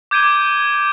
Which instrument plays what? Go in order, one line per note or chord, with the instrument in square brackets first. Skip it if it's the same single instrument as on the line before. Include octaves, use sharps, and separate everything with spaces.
[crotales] D6 G6 G#6 D7 D#7 G7